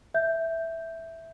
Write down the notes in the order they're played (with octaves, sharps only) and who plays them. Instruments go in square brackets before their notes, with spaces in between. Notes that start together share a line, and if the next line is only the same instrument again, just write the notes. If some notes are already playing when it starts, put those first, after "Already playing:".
[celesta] E5 G6